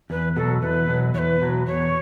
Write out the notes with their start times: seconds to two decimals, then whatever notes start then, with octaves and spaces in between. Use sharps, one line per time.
0.10 E2 B4
0.36 B2 F#3 A4
0.62 E2 B4
0.89 B2 F#3
1.14 E2 B4 C#5
1.42 B2 F#3
1.67 E2 C#5